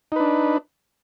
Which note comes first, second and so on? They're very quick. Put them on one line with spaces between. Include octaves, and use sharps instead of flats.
D#4 B4 D4